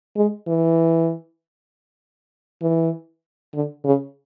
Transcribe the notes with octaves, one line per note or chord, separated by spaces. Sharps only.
G#3
E3
E3
D3
C#3